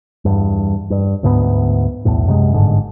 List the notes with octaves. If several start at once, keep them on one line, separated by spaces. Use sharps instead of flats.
E2 G2
G2
D2 G#2 D#3 B3
B1 E2 A2
F#2 C3 G3 G#3
G1 G#2 D3